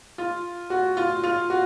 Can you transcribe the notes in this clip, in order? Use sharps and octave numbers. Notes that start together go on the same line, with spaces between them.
F4
F#4
F4
F4
F#4